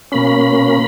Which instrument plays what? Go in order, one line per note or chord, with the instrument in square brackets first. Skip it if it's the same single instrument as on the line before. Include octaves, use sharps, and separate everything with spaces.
[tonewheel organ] B2 A#3 C#4 B5